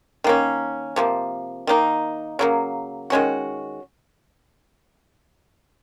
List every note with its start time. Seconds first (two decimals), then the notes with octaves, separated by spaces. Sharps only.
0.24 D#3 A#3 C#4
0.96 C3 F3 A#3
1.67 D#3 A#3 D#4
2.39 C#3 F#3 A#3
3.10 D#3 G#3 C#4 F#4